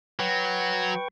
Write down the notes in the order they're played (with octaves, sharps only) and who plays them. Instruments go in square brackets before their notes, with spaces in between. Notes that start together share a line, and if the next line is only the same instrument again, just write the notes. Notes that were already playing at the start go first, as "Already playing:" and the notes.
[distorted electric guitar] F#3 [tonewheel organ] B4 G5 C#6